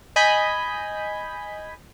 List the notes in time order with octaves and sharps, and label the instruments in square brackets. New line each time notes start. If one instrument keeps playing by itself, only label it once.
[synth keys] D#5 G#5 B5 G6 B6